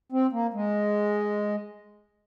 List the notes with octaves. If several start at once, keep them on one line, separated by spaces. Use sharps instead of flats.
C4
A#3
G#3